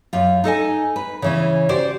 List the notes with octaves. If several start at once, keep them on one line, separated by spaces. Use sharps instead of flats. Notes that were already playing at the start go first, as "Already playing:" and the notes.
F#2 F4
D#4 A4 D#5 G#5
B4
C#3 E3 C#4
F#4 G4 C5 D5